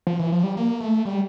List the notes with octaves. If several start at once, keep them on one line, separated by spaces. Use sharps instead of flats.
F3
E3
F3
G3
A#3
A3
G3